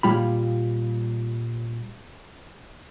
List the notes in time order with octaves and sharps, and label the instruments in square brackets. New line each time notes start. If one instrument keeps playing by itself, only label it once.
[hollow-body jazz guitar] A#2 G3 F4 B5